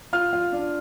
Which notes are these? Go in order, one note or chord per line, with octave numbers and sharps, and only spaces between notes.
F4 F6
F4
D4